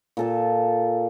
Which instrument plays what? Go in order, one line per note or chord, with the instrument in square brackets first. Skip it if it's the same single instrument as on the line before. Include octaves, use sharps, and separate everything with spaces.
[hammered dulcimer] A#2 A4 A5